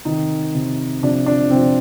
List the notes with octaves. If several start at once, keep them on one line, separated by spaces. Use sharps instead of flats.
C3 D#3 D#4
C3 D#3
C3 F3 D4
D4
C3 F3 C4